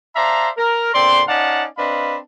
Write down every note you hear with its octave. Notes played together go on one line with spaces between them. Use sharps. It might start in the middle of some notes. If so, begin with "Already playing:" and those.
C5 D5 E5 F5 A5 A#5
A#4
A#2 D3 C4 D5 C6
C#4 D#4 D5 F5 F#5 A5
C4 D4 B4 D#5 F5 B5